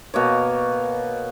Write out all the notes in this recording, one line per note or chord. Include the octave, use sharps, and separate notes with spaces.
B2 A#3 C#5